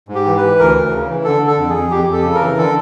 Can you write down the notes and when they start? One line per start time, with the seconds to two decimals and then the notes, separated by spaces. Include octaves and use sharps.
0.09 G#2
0.15 G4
0.26 E3
0.37 E3 B4
0.59 D2 A#4
0.75 D2
0.91 C#3
1.09 E3
1.24 D3 A4
1.42 D3
1.47 A4
1.58 F2
1.69 G#4
1.75 F2
1.91 F2 G4
2.08 F2 A4
2.24 C#3
2.35 A#4
2.41 E3
2.58 D3 A4